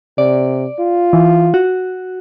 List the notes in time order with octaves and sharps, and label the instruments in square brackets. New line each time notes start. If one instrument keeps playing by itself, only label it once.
[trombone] C3 [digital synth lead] D5
[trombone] F4
[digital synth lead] E3
F#4